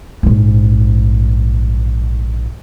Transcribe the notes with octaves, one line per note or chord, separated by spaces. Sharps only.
A#1 G#2